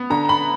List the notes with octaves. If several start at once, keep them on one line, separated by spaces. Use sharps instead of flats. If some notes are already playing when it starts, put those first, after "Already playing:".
Already playing: B3
D3 A#5
B5